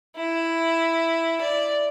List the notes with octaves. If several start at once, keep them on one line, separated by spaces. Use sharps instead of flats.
E4
D5